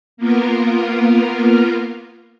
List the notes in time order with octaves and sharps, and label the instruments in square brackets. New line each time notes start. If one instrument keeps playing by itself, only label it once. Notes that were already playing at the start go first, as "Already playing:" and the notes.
[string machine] A#3 B3 F4 A#4